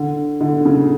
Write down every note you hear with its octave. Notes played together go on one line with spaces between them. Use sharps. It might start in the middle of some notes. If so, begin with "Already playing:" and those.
Already playing: D3
D3
C#3